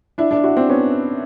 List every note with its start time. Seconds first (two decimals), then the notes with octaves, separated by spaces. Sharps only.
0.18 D4 E4
0.31 D4 E4
0.43 E4 F#4
0.57 C4 D4
0.69 B3 C#4